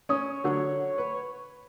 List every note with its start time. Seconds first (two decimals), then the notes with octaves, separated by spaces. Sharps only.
0.09 C#4 C#5 D#6
0.44 D3 F#3
0.98 B4